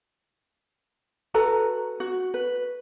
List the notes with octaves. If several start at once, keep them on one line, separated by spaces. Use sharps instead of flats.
F#4 A4 B4 A#5
F#4
B4